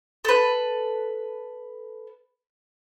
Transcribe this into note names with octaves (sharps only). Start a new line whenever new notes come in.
A4 B4